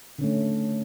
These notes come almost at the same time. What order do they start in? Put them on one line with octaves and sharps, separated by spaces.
D3 C#4 A3